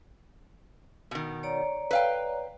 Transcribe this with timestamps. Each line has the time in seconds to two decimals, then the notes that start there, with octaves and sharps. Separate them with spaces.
1.11 B2 D#3
1.43 C#5 D5 A#5
1.91 B4 F5 G5